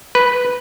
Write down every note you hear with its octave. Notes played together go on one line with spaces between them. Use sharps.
B4